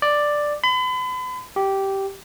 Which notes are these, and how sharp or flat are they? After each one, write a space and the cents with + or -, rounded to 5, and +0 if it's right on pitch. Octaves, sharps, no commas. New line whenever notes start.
D5 +5
B5 +40
G4 -10